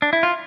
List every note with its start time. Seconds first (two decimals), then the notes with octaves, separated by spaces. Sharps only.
0.02 D4
0.13 E4
0.23 F4